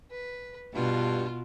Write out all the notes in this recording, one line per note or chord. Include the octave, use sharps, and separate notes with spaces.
B4
G2 B2 F4